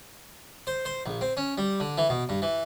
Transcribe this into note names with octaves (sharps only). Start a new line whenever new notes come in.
C5
C5
A#1
C4
C#4
G3
D3
E3
B2
G2
E3